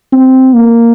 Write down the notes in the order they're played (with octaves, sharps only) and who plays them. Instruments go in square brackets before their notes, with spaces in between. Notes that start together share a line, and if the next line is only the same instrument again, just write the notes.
[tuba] C4
A#3